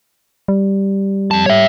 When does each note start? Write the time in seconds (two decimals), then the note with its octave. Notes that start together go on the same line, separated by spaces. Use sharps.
0.48 G3
1.31 F2 A5
1.46 C#5 E5